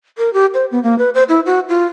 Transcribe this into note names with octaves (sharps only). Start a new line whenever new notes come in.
A#4
G4
C5
B3
A#3
B4
C5
E4
F#4
F4